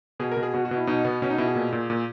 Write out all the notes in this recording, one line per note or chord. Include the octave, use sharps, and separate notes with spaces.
B2 G#4
A#4
B2
G#4
B2 F#4
F#4
B2
E4
B2 D#4
B2 B3
B2 C#4
D#4
B2 E4
G#4
A#2
A#2
A#2